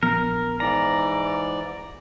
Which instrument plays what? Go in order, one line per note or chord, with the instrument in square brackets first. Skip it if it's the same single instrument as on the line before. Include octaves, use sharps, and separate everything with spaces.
[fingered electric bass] A#1 F3 B3 [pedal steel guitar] A#4
[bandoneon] G#2 E3 D5 [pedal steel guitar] A#5